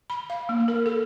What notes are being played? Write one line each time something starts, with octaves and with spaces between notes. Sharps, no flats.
B5
F5
A#3
A#4
A4